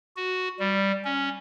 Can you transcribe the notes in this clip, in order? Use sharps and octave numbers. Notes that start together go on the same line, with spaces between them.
F#4
G3
C#4